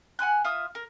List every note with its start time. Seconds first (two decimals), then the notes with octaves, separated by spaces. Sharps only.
0.19 F#5 G#5 C6 F#6
0.44 F4 E5 D#6
0.75 A#4